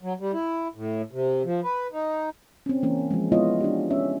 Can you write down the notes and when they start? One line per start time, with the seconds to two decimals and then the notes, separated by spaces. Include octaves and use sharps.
0.02 F#3
0.20 G3
0.33 E4
0.75 A2
1.12 C3
1.45 F3
1.64 B4
1.92 D#4
2.66 C4 C#4
2.83 E3 A#3 C#4 A#4
3.11 F3 G#3
3.32 G#3 B3 E4 F4 C#5 D#5
3.61 D4 G4
3.90 C#4 C#5 E5